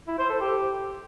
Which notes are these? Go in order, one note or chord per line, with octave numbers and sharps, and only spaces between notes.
E4
C5
A4
G4